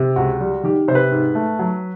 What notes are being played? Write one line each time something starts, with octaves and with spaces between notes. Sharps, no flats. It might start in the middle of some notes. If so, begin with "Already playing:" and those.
Already playing: C3
C#2 F#4
G3
D#3 G4
C3 C5
B4
G#2
A3
F#3